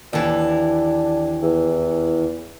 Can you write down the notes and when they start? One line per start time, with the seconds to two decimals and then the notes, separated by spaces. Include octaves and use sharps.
0.13 D#2 E3 D4
1.42 E2